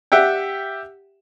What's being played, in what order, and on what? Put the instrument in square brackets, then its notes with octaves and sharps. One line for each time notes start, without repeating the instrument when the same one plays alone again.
[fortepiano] G4 E5 F#5 G5